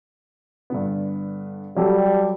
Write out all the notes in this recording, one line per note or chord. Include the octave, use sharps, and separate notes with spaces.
G2 D3 B3
F#3 G3 G4 A4